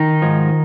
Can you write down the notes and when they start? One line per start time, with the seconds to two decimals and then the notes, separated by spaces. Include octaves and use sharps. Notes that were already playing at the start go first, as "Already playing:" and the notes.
Already playing: D#3 D#4
0.22 G#2 F3 G#3